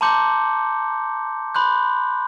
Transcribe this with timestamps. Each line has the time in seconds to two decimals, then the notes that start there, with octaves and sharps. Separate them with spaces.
0.01 A5 A#5 C6 D6 G6 C#7
1.55 B5 C6 F#6 G6